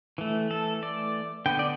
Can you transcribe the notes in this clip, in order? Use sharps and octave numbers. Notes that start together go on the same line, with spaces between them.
E3 A3
A4
D5
D3 B3 G5
D5